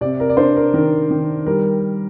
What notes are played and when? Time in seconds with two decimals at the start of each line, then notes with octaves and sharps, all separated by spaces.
0.01 C3 D5
0.20 A#4
0.29 D5
0.37 D4 C5
0.56 A#4
0.74 D#3 A#4
1.10 D#3
1.46 G3 A#4